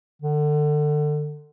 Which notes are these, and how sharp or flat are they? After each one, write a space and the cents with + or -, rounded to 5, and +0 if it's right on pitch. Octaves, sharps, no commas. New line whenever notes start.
D3 +25